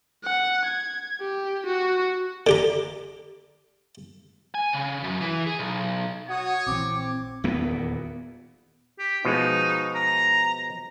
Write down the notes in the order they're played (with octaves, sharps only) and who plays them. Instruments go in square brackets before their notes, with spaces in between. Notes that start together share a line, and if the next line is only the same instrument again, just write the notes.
[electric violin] F#5
G#6
G4
F#4
[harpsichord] D3 G4 A#5
[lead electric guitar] G#5
C#3
F#2
E3
G#4
B1
[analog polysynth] F#4 D#6 [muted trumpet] C#5
[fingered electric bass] A#1 E3 [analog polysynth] C4 [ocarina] D6
[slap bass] D#1 E2 A#2 B3
[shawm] G4
[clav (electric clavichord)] B2 F3 G#3 [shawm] D#4
[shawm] A#5